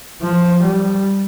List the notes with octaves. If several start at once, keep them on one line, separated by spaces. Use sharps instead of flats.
F3
G3